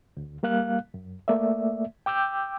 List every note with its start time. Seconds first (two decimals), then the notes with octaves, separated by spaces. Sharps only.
0.17 D2
0.43 G3 A#3 F5 F#6
0.94 F#2
1.28 A3 A#3 D5 E5
2.06 G5 D6 E6 G6